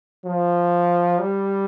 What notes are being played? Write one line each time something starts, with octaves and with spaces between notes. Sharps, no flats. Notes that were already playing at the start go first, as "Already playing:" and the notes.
F3
G3